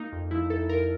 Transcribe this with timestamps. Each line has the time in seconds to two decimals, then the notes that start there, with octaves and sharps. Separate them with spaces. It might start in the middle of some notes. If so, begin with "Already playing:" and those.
Already playing: A#3 D#4
0.12 F2
0.31 F3 E4
0.50 F2 A4
0.69 F2 A#4